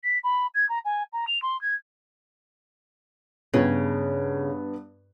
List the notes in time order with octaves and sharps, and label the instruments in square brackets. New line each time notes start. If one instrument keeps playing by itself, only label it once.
[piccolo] B6
B5
G#6
A#5
G#5
A#5
F7
C6
G#6
[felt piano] G2 B3 [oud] C#3